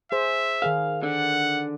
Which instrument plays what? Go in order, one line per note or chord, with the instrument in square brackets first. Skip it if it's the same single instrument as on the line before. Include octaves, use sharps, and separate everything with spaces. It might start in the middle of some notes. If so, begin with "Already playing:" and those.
[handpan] G#4 C5 [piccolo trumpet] E5
[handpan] D#3 G#4 A#4 [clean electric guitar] F5
[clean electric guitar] D3 [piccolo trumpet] F#5